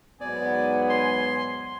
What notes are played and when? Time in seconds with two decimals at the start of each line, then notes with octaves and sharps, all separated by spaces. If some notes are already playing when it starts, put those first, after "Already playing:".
0.21 G#2 F#3 B3 D5 G#5
0.90 C6